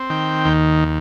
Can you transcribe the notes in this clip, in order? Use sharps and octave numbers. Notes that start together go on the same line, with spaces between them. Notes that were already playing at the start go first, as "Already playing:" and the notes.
Already playing: C4
D#3 G5
D#2